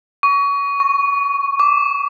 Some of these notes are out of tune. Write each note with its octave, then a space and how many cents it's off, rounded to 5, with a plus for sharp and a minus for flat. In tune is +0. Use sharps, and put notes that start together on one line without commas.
C#6 +30
C#6 -5
D6 -20